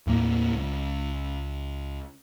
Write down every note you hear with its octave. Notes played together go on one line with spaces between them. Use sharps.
D#2 A2 A#3
C#2